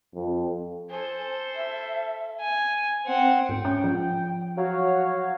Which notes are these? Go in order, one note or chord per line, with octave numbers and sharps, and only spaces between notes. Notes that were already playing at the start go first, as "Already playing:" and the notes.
F2
A4 C5 G#5
E5
G#5
C4 F#5
G#2 G5
C#4
F3
F#3 F#4 C#5 F5